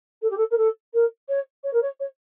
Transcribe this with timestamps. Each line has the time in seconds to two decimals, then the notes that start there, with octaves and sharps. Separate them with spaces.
0.22 A4
0.31 G4
0.37 A4
0.51 A#4
0.57 A4
0.94 A#4
1.29 C#5
1.64 C#5
1.73 A#4
1.82 C#5
2.00 C#5